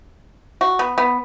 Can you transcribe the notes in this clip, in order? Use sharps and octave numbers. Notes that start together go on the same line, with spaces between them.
F#4
B3
B3